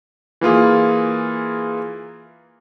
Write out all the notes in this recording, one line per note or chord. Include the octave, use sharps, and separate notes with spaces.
E3 A#3 F4 G#4